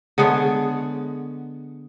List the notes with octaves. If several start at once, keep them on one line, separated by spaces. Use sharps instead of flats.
D3 G#3 B3 C#5